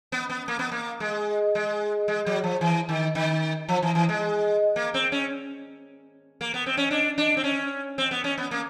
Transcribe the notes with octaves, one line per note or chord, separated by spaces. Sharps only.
B3
B3
A#3
B3
A#3
G#3
G#3
G#3
F#3
F3
E3
D#3
D#3
F3
E3
E3
G#3
A#3
C4
C#4
A#3
B3
C4
C#4
D4
D4
C4
C#4
C4
B3
C#4
B3
A#3